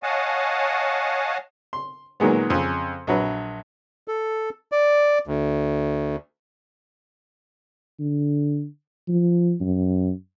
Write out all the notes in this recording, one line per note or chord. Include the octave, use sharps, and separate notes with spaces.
C#5 D#5 F5 F#5 G#5 A5
C6
A#2 D#3 F#3 G#3 B3
F2 C#3
A#1 F#3 B4
A4
D5
D2
D3
F3
F#2